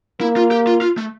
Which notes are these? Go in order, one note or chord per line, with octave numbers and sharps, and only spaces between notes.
A#3 E4
F4
G4
F4
F4
A3